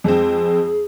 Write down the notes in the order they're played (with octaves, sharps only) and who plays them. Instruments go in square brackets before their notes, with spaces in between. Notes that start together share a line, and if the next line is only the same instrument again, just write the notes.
[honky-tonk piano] F2 G#3 C4 [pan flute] G#4